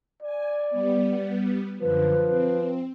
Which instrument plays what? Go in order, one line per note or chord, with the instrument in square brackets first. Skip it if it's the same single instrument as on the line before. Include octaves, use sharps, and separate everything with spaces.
[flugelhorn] D5 [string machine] G#5
[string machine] G3 B3
[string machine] F#2 D3 [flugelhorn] F3 [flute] B4
[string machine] C4